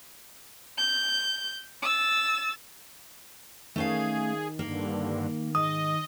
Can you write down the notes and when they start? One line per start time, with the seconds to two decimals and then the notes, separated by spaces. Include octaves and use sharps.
0.78 G6
1.82 E6 A6
3.76 D#3 A3 C#4 G#4 F5
4.59 G2 D3 A#3
5.55 G#2 D#5 D#6